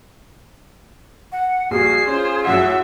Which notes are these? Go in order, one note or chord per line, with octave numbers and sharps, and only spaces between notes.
F#5
A#1 G3 F#4 G#4 C7
C#4 F4 C5
A1 F#2 E5 F#5 C7